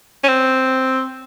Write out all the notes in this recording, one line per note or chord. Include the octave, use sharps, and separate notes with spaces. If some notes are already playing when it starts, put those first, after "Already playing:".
C#4
C4